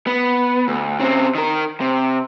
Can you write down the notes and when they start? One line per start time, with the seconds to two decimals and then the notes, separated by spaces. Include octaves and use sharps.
0.07 B3
0.68 D2
1.00 C#3 C4
1.35 D#3 A#4
1.81 C3